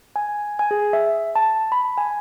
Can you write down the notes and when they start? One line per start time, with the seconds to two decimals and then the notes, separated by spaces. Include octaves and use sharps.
0.16 G#5
0.59 G#5
0.71 G#4
0.93 E5
1.35 A5
1.72 B5
1.97 G#5